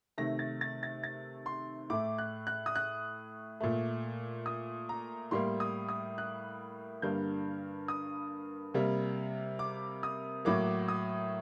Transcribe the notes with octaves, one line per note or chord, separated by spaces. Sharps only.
C3 D#3 A3 A#6
A6
A6
A6
A6
C6
A2 A3 D6
F#6
F#6
D#6
F#6
A#2 A3
D#6
A#5
A2 G3 A#3 C6
D#6
D#6
F#6
G2 D3 G3 A#3 G6
D#6
C3 G3 A#3
D6
D#6
A2 F#3 A#3 D6
D#6